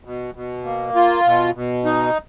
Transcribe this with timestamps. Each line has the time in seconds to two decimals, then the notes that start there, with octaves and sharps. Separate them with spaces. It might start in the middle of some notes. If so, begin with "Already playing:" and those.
0.05 B2
0.35 B2
0.65 A#3
0.95 F4
1.25 B2
1.55 B2
1.85 D#4